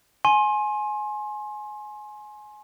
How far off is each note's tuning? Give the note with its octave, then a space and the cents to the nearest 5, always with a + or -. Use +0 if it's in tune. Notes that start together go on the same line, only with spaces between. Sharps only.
G#5 +20 C6 +30